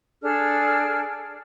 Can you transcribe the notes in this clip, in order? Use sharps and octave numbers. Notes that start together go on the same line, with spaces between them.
D4 G#4 A4 F6